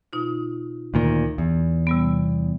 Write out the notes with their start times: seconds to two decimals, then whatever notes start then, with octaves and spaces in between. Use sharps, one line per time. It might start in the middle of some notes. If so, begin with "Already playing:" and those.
0.13 B2 D#4 F4
0.94 D2 A#2 D#3
1.38 E2
1.87 C3 G3 B3